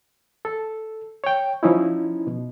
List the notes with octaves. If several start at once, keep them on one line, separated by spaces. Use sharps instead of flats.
A4
C#5 G5
F3 C#4 D#4 E4
B2